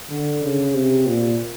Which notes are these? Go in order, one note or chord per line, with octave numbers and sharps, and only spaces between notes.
D3
C#3
C3
A#2